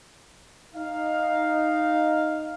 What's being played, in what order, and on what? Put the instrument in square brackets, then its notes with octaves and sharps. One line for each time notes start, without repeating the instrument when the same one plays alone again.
[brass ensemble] D#4 F5